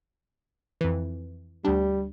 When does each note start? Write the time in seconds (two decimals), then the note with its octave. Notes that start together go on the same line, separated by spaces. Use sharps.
0.81 F2 E3
1.65 D2 G3 D4